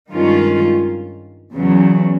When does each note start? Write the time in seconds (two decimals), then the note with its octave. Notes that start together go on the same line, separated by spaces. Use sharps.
0.12 G2 D#3 G#3 C#4 F4
1.52 E2 C#3 F#3